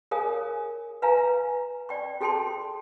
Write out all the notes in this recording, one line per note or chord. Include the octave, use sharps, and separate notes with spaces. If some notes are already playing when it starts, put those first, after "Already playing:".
G#4 A#4 C#5 F5 G#5 D#6
B4 E5 F5 G#5 A#5
D5 G5 C#6
F#4 G#4 A4 G5 A5 C6